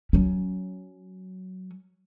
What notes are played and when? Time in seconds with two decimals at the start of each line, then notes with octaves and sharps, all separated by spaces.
0.13 F#3 C#4